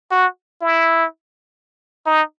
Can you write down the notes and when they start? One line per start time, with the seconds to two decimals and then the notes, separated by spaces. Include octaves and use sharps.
0.11 F#4
0.61 E4
2.06 D#4